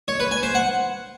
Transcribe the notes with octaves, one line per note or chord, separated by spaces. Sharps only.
C#5
B4
G#5
C5
F#5